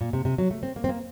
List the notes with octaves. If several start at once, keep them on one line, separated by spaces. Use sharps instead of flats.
A#2
C3
C3
F#3
A3
C4
A#3
C4
A#3